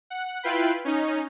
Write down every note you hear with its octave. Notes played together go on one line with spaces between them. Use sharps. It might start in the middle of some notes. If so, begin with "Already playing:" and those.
F#5
E4 F4 B4 G5 B5 C7
C#4 D#4